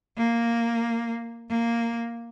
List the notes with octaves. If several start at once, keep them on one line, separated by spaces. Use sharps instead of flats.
A#3
A#3